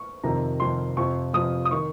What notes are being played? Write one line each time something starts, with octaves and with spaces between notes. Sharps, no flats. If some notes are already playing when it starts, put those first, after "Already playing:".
Already playing: C#6
F2 C3 D#3 A#5
F2 C3 D#3 C6
F2 C3 F3 C#6
F2 C3 F3 D#6
D#6
D#3 C#6